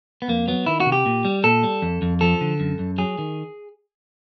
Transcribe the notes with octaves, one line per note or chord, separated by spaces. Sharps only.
B3
F2 A#3
F#3 B3
D#3 E4
F#4
C3
G4
A#2
G3
A#2 A4
G3
F2
F2
F3 A4
D3
F#2
F#2
F#3 G#4
D#3